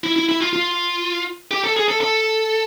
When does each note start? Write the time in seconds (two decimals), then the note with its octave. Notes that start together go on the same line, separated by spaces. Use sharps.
0.04 E4
0.16 E4
0.29 E4
0.40 F4
0.53 F4
1.51 G4
1.64 A4
1.76 G#4
1.88 A4
2.01 A4